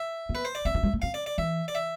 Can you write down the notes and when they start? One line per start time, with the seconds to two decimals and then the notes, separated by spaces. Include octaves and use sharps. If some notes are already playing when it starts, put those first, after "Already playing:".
Already playing: E5
0.29 B3
0.35 B4
0.45 C5
0.55 D5
0.65 C4 E5
0.74 D4
0.83 G3
0.93 A3
1.02 C4 F5
1.14 D5
1.26 D5
1.38 E3 E5
1.68 D5
1.75 E5